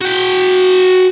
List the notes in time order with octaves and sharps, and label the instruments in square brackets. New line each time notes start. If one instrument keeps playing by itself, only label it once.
[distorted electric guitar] F#4 G5